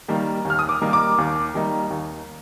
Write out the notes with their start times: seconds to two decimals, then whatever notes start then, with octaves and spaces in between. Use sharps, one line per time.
0.08 D#3 G3 A#3 D#4
0.45 D#2
0.50 F6
0.59 D#6
0.69 D6
0.81 D#3 G3 A#3 D#4
0.93 D6
1.18 D#2
1.54 D#3 G3 A#3 D#4
1.90 D#2